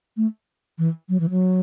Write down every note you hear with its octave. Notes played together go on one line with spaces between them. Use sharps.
A3
E3
F#3
E3
F#3